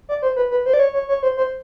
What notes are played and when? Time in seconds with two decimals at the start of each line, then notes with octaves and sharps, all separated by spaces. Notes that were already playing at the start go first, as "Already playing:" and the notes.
0.09 D5
0.22 C5
0.36 B4
0.51 B4
0.66 C5
0.74 D5
0.79 C#5
0.93 C#5
1.08 C#5
1.23 C5
1.37 C5